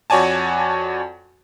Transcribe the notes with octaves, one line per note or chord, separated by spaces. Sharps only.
F2 F#4 C#5 D5 G#5 A5